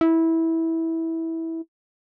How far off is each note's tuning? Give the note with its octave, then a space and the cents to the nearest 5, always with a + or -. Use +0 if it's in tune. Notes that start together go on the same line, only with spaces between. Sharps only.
E4 -15